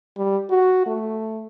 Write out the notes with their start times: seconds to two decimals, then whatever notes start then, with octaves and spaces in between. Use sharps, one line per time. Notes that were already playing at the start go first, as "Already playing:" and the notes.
0.17 G3
0.50 F#4
0.86 A3